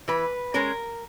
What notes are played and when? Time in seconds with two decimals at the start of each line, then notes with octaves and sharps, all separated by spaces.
0.08 E3 B4
0.54 G#3 C#4 A#4